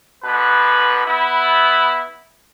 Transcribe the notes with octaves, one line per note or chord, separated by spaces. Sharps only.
B2 D3 B4
B3 E4